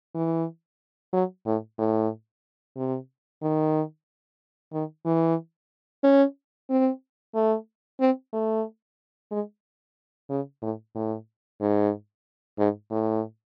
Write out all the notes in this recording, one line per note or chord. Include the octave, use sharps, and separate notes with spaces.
E3
F#3
A2
A2
C3
D#3
D#3
E3
C#4
C4
A3
C4
A3
G#3
C#3
A2
A2
G#2
G#2
A2